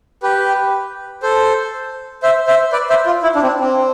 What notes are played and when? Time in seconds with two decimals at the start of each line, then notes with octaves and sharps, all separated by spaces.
0.23 G4 B4
1.22 A4 C5
2.23 C5 E5
2.47 C5 E5
2.72 B4 D5
2.89 C5 E5
3.06 F4
3.23 E4
3.35 D4
3.43 C4
3.47 D4
3.60 C4